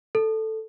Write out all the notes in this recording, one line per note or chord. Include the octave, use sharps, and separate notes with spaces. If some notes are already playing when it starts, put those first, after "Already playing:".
A4